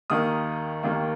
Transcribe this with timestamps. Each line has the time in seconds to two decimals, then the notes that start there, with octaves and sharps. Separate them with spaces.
0.10 D#2 D#3 A#3 D#6
0.83 D#2 D#3 A#3